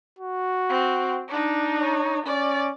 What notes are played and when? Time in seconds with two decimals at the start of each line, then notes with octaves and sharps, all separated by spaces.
0.19 F#4
0.70 C4
1.28 D4 D#4
1.81 C#5
2.26 C#4 D5